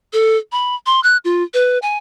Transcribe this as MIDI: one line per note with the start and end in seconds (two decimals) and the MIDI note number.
0.13 0.37 69
0.52 0.75 83
0.86 1.00 84
1.03 1.17 90
1.25 1.43 65
1.54 1.78 71
1.82 1.98 80